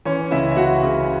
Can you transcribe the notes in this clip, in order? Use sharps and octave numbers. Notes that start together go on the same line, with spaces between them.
E3 C#4 C#5
C#2 E4 E5
E5
C#2 F#4 F#5
C#3